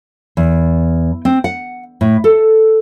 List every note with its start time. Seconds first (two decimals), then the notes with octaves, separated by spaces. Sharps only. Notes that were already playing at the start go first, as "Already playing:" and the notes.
0.37 E2
1.25 C4
1.44 F#5
2.01 A2
2.24 A4